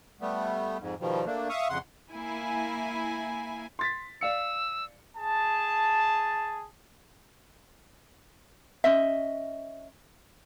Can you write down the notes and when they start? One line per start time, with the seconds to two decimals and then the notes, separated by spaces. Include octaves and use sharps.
0.21 G3 A3 B3
0.80 F2 G#2
1.00 B2 D#3 F3 G3
1.26 A3 A#3 D4
1.49 E5 F5 C#6 D#6
1.69 F2 C#3 F#5 C6
2.12 A#3 E4 G#5
3.79 C6 A6 B6
4.21 D5 F5 E6 C#7
5.17 G#4 A5
8.84 C#4 D#5 E5